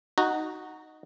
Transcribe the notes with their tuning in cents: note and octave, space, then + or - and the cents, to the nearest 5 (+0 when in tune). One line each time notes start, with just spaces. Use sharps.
D#4 +0 F#4 +0 A#5 -25